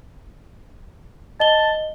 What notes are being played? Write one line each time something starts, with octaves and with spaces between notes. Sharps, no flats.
D#5 A5 G7